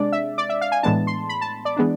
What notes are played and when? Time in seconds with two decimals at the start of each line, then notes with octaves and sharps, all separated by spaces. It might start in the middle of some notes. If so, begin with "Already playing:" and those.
Already playing: C3 G#3 D4 D5
0.12 E5
0.38 D5
0.49 E5
0.61 F5
0.72 G#5
0.83 A2 E3 G#3 B3 D4 A5
1.07 C6
1.29 B5
1.41 A5
1.65 D5
1.77 E3 G#3 B3 D4